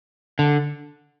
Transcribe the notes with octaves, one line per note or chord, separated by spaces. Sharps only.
D3